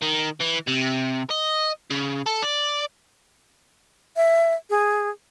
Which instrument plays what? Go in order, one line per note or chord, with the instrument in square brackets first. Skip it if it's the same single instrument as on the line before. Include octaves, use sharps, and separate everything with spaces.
[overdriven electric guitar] D#3
E3
C3
D#5
C#3
A4
D5
[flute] E5
G#4